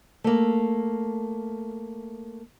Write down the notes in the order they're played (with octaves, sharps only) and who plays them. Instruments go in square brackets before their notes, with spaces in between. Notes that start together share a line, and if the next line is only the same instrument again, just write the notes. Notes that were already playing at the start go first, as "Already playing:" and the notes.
[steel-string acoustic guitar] A3 A#3